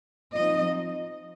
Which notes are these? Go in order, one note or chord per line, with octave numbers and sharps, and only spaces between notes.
F3 C4 D#4 D#5